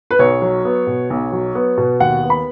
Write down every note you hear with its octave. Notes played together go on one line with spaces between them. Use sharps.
B4
B1 C#5
F#3
B3
B2
B1
F#3
B3
B2
D#2 F#5
B3
B5